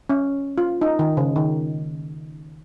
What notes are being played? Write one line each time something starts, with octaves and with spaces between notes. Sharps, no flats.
C#4
F4
D#4
D#3
C#3
D#3